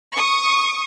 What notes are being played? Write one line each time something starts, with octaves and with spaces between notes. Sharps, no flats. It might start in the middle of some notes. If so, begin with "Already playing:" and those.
C#6 D#6